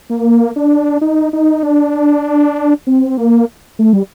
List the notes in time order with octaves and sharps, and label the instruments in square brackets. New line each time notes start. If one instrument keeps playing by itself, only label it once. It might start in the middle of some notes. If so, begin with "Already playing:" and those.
[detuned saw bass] A#3
D4
D#4
D#4
D4
C4
A#3
A3
G3